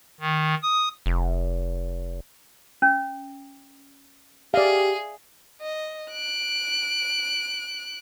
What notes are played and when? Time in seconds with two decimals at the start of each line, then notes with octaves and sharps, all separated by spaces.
0.20 D#3
0.63 D#6
1.06 F1
2.82 C#4
4.54 G4 G#4 D5 E5 F5
5.61 D#5
6.11 F#6 D7